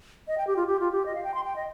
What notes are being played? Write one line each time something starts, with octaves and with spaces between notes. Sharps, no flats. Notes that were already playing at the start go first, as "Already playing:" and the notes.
D#5
G5
G4
F4
G4
F4
G4
D#5
F5
G5
C6
G5
D#5